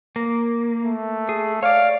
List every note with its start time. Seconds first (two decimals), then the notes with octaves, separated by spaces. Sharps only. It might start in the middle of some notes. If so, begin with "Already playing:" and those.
0.16 A#3
0.82 A3
1.29 G#4
1.63 C#5 D5 F5